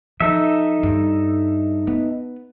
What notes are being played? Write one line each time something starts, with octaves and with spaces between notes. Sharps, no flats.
F3 D#4 A4 E5
G2
B3